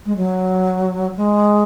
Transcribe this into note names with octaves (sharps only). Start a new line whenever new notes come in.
G#3
F#3
G#3